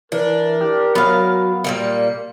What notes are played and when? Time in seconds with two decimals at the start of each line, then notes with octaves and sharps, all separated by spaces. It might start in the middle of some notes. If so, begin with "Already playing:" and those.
0.12 E3 D4 A#4
0.61 G4
0.95 F#3 B3 F5
1.64 A#2 G3 A#3 C#7